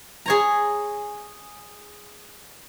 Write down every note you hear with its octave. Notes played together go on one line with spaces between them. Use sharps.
G#4 C#5 A#5